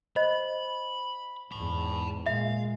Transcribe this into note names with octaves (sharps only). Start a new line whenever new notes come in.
C5 D#5 B5
E2 G#2 A5 B5
A#2 G#3 E5 F5